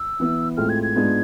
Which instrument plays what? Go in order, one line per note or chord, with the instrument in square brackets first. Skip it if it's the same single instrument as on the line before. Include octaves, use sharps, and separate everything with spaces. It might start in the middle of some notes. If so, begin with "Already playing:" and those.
Already playing: [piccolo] E6
[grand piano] E3 B3 E4
[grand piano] A2 G#3 C4 F4 A4 [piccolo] F6
[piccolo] G#6
G#6
[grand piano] G#2 G#3 B3 D4 F4